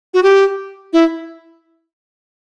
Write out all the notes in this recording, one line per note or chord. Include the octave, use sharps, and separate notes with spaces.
F#4
G4
E4